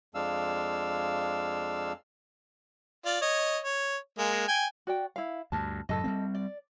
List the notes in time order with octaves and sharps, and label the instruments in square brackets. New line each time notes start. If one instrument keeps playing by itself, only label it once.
[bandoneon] F2 G#3 D4 F5 E6
[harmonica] F4 D5
C#5 D#5
C#5
G#3 A#3
G5 G#5
[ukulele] F#4 D5 G5
E4 F5
[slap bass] D2 G2 [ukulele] A5
[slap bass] F#2 A2 C#3 [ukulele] A4 D#5
[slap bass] G3 A3 C4
[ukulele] D5